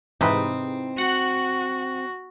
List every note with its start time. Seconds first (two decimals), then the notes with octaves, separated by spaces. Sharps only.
0.21 G#2 C3 E3 C4 D#4 B4
0.98 F#4 F#5 F#6